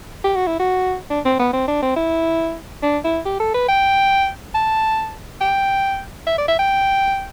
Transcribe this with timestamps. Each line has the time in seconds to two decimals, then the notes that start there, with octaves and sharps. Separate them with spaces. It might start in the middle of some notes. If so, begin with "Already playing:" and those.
0.24 G4
0.35 F#4
0.47 E4
0.59 F#4
1.10 D4
1.25 C4
1.39 B3
1.53 C4
1.68 D4
1.82 C4
1.96 E4
2.82 D4
3.04 E4
3.25 G4
3.40 A4
3.54 B4
3.68 G5
4.54 A5
5.41 G5
6.27 E5
6.38 D5
6.48 E5
6.59 G5